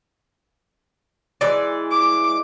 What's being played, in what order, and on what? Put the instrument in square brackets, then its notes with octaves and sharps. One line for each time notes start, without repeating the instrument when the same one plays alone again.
[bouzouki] E3 G#3 D5
[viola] D6